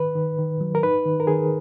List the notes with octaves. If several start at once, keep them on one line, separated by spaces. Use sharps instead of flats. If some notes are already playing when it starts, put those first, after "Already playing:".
Already playing: D#3 B4
D#3
D#3
F#3
A#4
D#4 B4
D#3
A#4
D#3 G#4